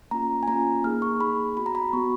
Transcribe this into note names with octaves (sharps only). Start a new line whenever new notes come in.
A#3 C#4 F4 A#5
G#5
A#3 C#4 F4 A#5
A#3 D#4 G#4 F6
C#6
A#3 D#4 G#4 B5
B3 F#4 B5
A#5
B5
B3 F#4 C#6